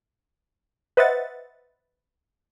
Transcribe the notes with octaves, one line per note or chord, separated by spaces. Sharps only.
B4 C5 D#5 E5 F#5 A6